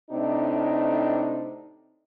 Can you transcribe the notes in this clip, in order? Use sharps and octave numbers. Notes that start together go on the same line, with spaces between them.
A2 C3 D4 D#4